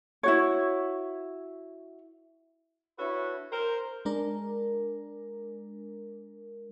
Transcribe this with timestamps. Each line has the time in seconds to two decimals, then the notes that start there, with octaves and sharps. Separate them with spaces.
0.23 E4 F#4 C#5
2.99 D4 E4 F#4 A4 B4 C#5
3.52 A#4 C5
4.05 G#3 D4 A#4